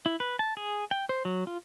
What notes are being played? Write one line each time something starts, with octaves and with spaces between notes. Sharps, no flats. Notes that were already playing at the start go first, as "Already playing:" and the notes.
E4
B4
A5
G#4
G5
C5
F#3
F4